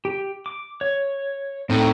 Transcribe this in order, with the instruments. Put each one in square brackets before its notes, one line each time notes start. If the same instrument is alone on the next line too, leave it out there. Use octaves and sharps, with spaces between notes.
[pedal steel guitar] G4
D6
C#5
[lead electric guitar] A2 [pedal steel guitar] C4 D#4